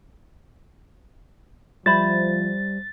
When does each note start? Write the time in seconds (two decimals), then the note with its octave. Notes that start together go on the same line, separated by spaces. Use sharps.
1.86 F3 G3 C5 E5 B5 A6